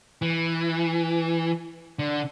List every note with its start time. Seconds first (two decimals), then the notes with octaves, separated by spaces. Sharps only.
0.22 E3
1.99 D3